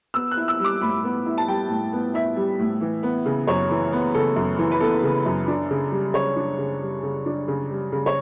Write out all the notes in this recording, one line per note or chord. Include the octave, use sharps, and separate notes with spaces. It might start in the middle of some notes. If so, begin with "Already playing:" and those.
B3 E6
F#6
E4
E6
G3
D6
A2 B5
B3
E4
A5
G3 G5
A2
B3
E4 E5
G3
A2
E3
B3
C#3
F#2 C#5
E3
B3
C#3 A4
F#2
E3
B4
B3 A4
C#3
F#2
D4
C#3
G3
C#3 C#5
D4
C#3
G3
C#3
D4
C#3
G3
C#3
C#5